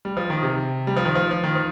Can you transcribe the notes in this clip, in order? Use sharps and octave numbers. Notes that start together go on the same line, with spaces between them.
G3
F3
D#3
C3
G3
F3
D#3
F3
F3
D#3
F3